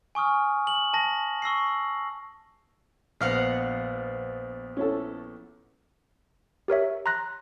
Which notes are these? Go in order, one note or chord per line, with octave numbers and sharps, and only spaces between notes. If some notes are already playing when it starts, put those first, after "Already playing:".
G#5 C#6 D#6 F6
F#7
A5 A#6
C#6 E6 A#6 C7
A#1 B3 C5 D#5 F5 F#5 F6
C#4 E4 A4
G4 A#4 C#5 E5
A#5 C6 F#6 A#6